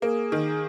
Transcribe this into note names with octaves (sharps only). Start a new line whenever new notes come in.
A#3 G#4
D#3